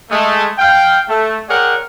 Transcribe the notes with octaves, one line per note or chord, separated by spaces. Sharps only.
G#3 A3
F5 G5
A3
G#4 A#4 C#5 D5 F#5 G5